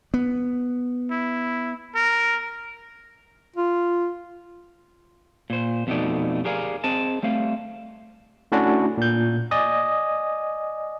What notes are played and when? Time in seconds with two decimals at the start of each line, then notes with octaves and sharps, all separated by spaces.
0.14 B3
1.11 E4
1.95 A#4
3.56 F4
5.50 A#2 C5
5.87 F2 B2 A3 D#4 D5
6.45 G4 G#4 A#4 D5 F5
6.84 C4 G#4 D#5 A5
7.23 G3 A3 C4 F5
8.52 A3 C#4 D4 E4 F#4
8.98 A#2 G6
9.51 D5 D#5 G#5 D#6